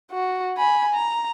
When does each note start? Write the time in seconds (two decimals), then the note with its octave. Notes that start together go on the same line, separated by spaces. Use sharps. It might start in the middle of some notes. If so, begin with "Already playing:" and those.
0.12 F#4
0.58 G#5 B5
0.94 A#5